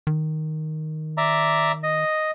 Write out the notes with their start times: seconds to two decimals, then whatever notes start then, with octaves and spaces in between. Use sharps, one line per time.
0.07 D#3
1.17 D5 E5 A#5
1.83 D#5